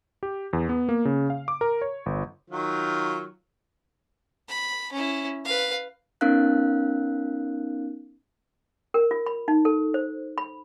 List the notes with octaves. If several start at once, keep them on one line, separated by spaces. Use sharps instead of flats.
G4
E2
B3
A#3
C#3
F5
D6
A#4
C#5
G1
D#3 F#3 F4
B5
C#4 E4
B4 F5
B3 C#4 D#4 A#4 F5 F#6
A#4
F4
B5
D#4
A4
C5
B5